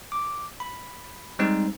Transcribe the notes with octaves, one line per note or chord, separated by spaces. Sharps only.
D6
B5
G3 G#3 C4 D#4 C5